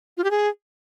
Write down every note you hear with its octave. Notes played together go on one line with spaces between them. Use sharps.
F4
G4
G#4